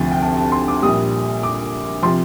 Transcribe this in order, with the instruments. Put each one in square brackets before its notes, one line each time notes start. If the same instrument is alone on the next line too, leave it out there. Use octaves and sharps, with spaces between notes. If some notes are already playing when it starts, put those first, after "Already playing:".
Already playing: [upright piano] D2 C3 F3
G5
A5
A5
C6
D6
A#1 A#2 G3 D#6
D6
C3 F3 C6